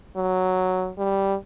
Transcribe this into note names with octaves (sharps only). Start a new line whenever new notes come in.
F#3
G3